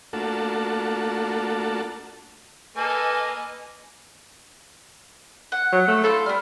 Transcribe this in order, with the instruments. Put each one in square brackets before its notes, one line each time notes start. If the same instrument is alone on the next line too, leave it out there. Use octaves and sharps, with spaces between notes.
[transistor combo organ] A3 A#3 D4 F4 F#4 A4
[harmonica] A#3 A4 [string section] B4 D#5 G#5
[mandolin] F#5
[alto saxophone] F#3
A3
[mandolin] E4 F4 C5 [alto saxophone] A4
[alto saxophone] G3 [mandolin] B3 F6